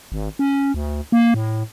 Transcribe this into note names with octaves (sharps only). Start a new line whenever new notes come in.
G#1
C#4
D2
A#3
A2